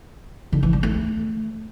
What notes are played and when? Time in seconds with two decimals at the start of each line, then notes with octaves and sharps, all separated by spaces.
0.52 D3
0.63 E3
0.73 G3
0.83 A3